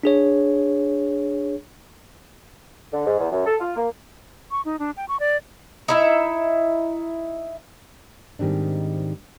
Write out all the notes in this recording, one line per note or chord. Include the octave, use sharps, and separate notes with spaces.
D4 G#4 C#5
D3
G#2
E2
F#2
A4
F4
A#3
C#6
D#4
D4
G5
C#6
D5
D#4 E4 E5
G#2 D#3 G3 C4 D4